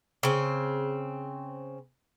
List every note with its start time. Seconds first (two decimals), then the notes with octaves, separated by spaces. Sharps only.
0.23 C#3 C4